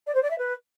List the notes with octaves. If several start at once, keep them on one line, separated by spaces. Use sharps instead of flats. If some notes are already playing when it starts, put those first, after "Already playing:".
D5
C5
D5
E5
B4